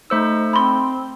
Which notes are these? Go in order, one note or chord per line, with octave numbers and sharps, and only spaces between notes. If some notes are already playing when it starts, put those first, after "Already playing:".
A3 D#4 C5 E6
C4 B5 C6